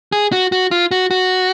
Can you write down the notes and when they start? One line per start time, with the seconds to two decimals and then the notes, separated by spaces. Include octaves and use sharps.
0.12 G#4
0.32 F#4
0.52 F#4
0.71 F4
0.91 F#4
1.11 F#4